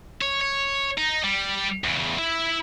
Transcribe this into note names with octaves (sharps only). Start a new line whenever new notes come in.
C#5
C#5
D#4
G3
E2 C#3
E4 E5